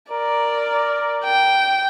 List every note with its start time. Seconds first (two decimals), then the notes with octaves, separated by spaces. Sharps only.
0.11 A#4 D5
1.25 G5